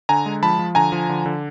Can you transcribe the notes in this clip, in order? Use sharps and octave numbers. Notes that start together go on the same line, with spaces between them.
D3 G#5 A#5
G#3
F3 A5 B5
F3
D3 G#5 A#5
F3
D3
D3